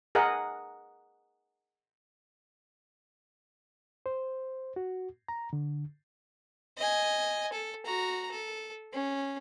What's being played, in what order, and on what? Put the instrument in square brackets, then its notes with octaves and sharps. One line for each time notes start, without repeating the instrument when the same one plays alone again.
[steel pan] G#4 A#4 D#5 F#5
[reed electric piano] C5
F#4
A#5
D3
[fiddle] D#5 G#5
A4
F#4 A#5
A4
C#4